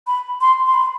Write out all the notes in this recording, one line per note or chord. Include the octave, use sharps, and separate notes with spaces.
B5
C6
C6
B5